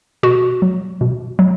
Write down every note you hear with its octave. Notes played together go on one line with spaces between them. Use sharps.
B2 F#4
F#3
B2
F#3